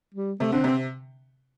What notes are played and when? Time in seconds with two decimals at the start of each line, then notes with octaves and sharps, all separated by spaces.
0.14 G3
0.40 C3 A3
0.52 D3 C4
0.64 C3 C4